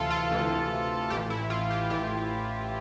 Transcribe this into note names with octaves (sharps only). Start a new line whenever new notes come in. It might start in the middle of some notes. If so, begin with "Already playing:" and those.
Already playing: D2 C3 E3 F4 A4
F4
D2 C3 E3
A1 A2 E3 G4
E4
F4
G4
A1 A2 E3 G4